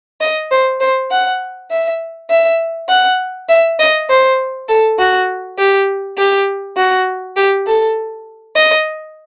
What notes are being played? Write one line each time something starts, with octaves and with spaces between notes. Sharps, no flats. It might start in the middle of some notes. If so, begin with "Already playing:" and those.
D#5
C5
C5
F#5
E5
E5
F#5
E5
D#5
C5
A4
F#4
G4
G4
F#4
G4
A4
D#5